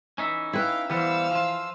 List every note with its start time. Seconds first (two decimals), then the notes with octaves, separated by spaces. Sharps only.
0.18 E3 C#4 D#4 E5
0.53 E4 B4 F5 G5
0.90 E3 G3 B3 C5 F5 E6
1.31 F3 F4